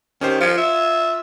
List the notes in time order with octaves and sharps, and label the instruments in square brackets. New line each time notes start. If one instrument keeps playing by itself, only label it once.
[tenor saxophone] D#3 [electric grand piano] C#4 G4 C5
[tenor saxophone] F3 [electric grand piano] F4 G#6
[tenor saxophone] E5